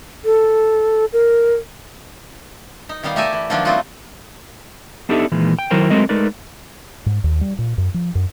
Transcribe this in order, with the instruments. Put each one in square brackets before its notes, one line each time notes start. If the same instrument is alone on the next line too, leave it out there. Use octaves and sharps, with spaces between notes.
[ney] A4
A#4
[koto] D#4
B2 D#3 G3 D#4 F5
A3 G4 A#4 D5 E5 G#5
E3
D#3 F3 F#3 A#3 D4 F4
G3 A3 C4 D#4 F4 F#4
[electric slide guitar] B3 D4 D#4 G4 A4 E5
A#2 D#3 E3 G#3
G5
D#3 F#3 E4 A#4 C5 G5
F#3 G#3 A3 C4 A#4 D#5
G#3 A3 D#4 A#4 B4 D5
[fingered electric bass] G#2
D#2
G3
A#2
F#2
F3
F#2